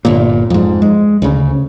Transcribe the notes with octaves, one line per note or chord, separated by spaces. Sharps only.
G1 A#2
F2 G#2
G#3
D2 C#3